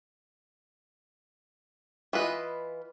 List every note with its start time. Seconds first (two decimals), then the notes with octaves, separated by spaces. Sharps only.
2.13 E3 F4 B4 D#5